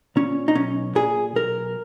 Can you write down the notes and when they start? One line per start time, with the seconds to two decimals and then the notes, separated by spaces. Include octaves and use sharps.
0.16 A#2 C#4
0.48 D#4
0.55 B1 C#4
0.95 A#2 G#4
1.36 B1 A#4